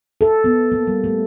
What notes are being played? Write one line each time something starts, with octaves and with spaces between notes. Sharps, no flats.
A4
B3
A#3
G3
A3